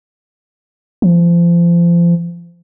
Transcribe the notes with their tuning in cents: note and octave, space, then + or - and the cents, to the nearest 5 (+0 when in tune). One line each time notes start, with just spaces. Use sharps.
F3 -30